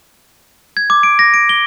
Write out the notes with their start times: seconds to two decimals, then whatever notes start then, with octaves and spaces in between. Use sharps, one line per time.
0.77 G#6
0.90 D6
1.03 D7
1.19 A#6
1.34 D7
1.49 G7